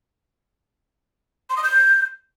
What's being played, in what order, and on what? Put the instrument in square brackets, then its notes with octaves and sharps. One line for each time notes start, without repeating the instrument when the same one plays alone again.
[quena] C6
D#6
G6